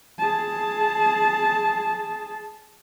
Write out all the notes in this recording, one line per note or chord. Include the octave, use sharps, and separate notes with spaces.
G#4 A5